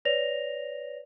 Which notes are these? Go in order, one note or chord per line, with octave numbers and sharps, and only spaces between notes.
B4 C#5 D5 A#6 F7